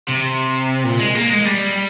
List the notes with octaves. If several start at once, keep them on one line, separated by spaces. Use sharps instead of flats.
C3
A#2
G#3
A#3
G#3
G3